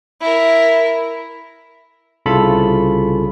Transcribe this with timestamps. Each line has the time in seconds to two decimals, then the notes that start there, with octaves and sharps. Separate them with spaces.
0.20 E4 A#4
2.26 C2 C#3 F4 A4 B5